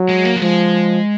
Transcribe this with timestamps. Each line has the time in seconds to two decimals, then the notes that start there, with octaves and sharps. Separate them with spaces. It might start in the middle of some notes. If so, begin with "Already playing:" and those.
Already playing: F#3
0.09 G#3
0.25 A#3
0.36 F#3
0.41 F3 G#3